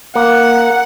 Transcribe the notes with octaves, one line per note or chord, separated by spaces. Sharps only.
A#3 F#5